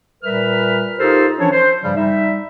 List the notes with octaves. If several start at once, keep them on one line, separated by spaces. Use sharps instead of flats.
A#2 G3 A#4 B4 E5 F6
D#4 F4 G4 A4 A#4 C5
E3 F3 C#4 D4 C#5
C5
G2 C#3 F3 G3
G3 D#4 E5